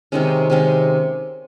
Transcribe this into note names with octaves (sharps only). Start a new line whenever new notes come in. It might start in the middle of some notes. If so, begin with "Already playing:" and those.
C3 D#3 G#3 C#4
C3 D#3 G#3 C#4